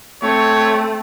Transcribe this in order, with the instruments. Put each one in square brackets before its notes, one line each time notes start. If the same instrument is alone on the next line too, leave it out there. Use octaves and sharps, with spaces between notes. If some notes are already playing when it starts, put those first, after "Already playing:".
[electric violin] A3 C4 [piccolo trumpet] C#5